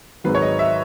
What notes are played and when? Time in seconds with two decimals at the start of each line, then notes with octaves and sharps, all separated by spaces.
0.24 G#1 G#2 D#3 F#3 B4
0.35 C#5
0.42 D#5
0.59 E5